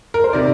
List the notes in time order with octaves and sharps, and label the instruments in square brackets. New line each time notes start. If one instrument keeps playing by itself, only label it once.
[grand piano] A#4
C5
[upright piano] C3 D#3 [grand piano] D5